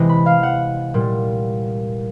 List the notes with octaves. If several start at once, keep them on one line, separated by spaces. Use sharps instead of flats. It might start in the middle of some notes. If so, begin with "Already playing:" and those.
Already playing: C3 E3 G#3
B5
F5
F#5
A#2 G3